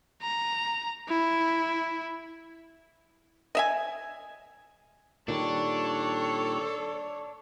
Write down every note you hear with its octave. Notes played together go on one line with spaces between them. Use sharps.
A#5
E4
D#5 E5 G#5
A#2 D#3 G3 D4 A4 C#5